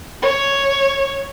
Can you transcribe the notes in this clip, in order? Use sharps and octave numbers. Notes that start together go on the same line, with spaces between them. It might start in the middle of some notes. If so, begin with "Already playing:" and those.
C#5